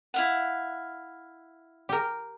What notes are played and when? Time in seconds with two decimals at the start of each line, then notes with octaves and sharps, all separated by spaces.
0.14 E4 F5 F#5
1.89 G4 A#4